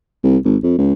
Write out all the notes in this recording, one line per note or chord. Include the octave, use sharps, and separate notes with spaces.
C2
G#1
F2
C#2